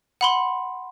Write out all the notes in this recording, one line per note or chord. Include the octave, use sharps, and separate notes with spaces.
F#5 B5 C6